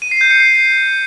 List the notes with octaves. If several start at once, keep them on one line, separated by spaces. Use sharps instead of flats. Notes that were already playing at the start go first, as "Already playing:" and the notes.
D#7
C7
G6
C#7
C7